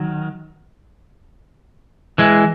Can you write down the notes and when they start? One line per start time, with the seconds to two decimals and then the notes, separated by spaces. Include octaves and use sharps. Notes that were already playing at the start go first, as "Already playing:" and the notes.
Already playing: D#3 F#3
2.18 E3 G#3